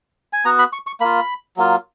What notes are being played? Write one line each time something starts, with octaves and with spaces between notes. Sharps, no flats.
G#5
B3 F#4 A#5
B5
C#6
C#6
A#3 F4 B5
F#3 A#3 F4